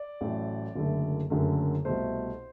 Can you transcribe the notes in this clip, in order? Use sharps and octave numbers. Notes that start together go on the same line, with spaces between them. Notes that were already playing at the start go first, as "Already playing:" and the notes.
Already playing: D5
A1 A2 F#3 A3
F#1 F#2 D3 A3
F#1 F#2 D3 A3
C2 B2 A3 C5